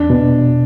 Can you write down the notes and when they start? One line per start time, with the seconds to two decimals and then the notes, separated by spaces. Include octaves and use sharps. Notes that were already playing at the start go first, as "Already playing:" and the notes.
Already playing: E2 D4
0.10 B2